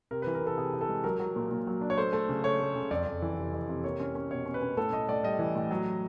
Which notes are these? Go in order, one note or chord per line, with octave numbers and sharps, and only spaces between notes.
C3 A#4
B4
E3
A#4
C3 A4
C3 G#4
C3
A4
G#3
F#3 A#4
F#3
A#2
A#2
F#3
D4
C#5
A3 C5
A3
C#3
A3 C#5
A3
C#3
F2 D5
F2
E3
C3
F2
C3
A#3 C#5
C#4
C#4
B2 C#5
C#4
B4
C#4
A2 A4
A2 D#5
A2 D5
G3 D#5
E3
A2
F#3